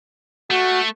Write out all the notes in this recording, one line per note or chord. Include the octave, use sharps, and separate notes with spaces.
A3 F#4